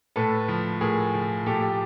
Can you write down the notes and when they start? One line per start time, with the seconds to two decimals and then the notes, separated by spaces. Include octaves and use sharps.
0.16 A2 A4 B4
0.48 F3
0.81 A2 G#4 A#4
1.14 F3
1.46 A2 G4 A4
1.62 G4